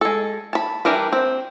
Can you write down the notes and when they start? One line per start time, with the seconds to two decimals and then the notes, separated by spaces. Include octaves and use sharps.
0.01 G#3 A4
0.53 A5 B5
0.85 E3 G3 D4 A#4 B4
1.12 C4